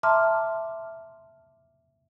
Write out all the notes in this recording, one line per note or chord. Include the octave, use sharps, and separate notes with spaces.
E5 A5 A#5 C6 D6 F6